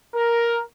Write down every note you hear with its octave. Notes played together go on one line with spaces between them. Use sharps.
A#4